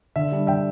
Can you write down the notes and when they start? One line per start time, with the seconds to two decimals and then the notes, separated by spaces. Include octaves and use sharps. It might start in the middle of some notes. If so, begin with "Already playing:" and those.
0.16 D3 E5
0.32 G3 D4
0.47 D3 E5 G5